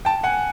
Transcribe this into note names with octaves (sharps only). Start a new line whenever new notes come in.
G5 A5
F#5 G#5